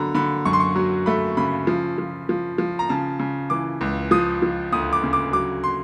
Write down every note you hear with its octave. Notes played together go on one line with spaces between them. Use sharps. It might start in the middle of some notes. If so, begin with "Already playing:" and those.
Already playing: D3 F#3 A#5 B5
D3 B5
F#2 C#6
C6
C#6
F#3
A3 B5
C#3 B5
F3
F3
F3
F3
A#5
C#3 A5
C#3
E3 D6
C#2
F3 D#6
F3
D2 D#6
D6
C#3
D6
F#3 D6
C6